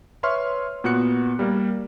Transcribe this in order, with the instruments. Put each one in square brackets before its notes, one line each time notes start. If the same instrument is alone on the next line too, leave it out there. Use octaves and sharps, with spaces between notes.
[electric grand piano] B4 C#5 E5 C6 C#6 F6
A#2 B3 F#4 F#6 C#7
G3 A#3 A#4 D5